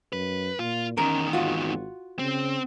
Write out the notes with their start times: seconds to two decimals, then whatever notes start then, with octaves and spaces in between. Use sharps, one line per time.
0.13 F#2 B4
0.59 A#2 F4
0.98 E2 D#3 C#4 A#4
1.33 G#1 F4 F#4
2.19 C#3 C4